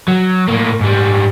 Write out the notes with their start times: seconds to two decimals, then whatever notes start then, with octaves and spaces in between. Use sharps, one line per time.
0.08 F#3
0.48 A2 A#3
0.80 G#2 G3